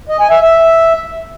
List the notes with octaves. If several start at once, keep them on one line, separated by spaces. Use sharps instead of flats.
D#5
G#5
E5
E5